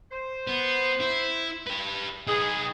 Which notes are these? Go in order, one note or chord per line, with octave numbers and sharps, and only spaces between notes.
C5
B3
E4
G4 B4
D#4 G#4 B4